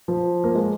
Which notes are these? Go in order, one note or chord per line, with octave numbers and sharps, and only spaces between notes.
F3
A#3
G#3